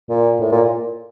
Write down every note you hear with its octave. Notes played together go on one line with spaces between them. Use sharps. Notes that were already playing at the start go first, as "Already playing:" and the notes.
A#2
A2
A#2